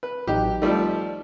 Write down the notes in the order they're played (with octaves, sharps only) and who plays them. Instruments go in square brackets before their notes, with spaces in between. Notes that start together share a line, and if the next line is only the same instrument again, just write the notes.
[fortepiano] B4
[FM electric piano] A1 F#3 D#4 [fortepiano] G4
[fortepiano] F3 G3 A3 [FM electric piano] D#4